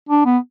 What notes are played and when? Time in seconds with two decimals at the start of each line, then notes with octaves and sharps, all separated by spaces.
0.09 D4
0.25 B3